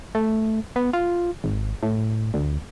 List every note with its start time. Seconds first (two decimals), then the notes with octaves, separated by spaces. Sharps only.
0.15 A3
0.76 B3
0.93 F4
1.44 G#1
1.83 A2
2.34 D2